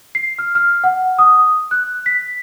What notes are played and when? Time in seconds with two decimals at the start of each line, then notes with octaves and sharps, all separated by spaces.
0.15 C7
0.39 F6
0.55 F6
0.84 F#5
1.19 D#6
1.71 F#6
2.06 B6